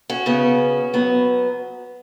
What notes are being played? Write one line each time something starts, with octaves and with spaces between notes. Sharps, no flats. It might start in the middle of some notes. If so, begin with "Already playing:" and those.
C#4 F#4
C#3 B3
F#3 B3